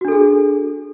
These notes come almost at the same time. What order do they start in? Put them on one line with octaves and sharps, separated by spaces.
F#4 D4 A4 G#4